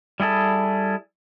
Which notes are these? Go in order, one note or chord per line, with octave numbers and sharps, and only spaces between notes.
G3 E4 G#4 A4